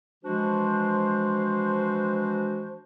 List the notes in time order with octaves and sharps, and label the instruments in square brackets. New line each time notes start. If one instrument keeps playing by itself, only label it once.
[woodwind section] E3 F3 G#3 D4 F#4 C5